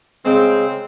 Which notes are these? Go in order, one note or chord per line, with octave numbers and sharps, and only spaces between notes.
C#3 G#3 C4